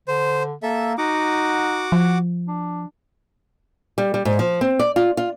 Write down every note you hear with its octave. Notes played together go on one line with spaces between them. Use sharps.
D3 C5
A#3 A4 E5
D#4 F#4 F#5 D6
F3
D4
G3
G3
G#2
F3
C4
D5
F4
F4